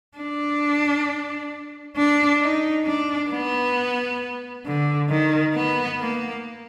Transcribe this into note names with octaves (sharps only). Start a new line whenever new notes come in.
D4
D4
D#4
D4
B3
D3
D#3
B3
A#3